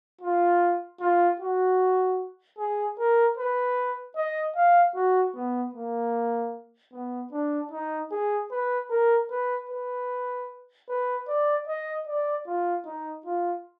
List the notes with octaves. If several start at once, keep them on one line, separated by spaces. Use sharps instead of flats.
F4
F4
F#4
G#4
A#4
B4
D#5
F5
F#4
B3
A#3
B3
D4
D#4
G#4
B4
A#4
B4
B4
B4
D5
D#5
D5
F4
D#4
F4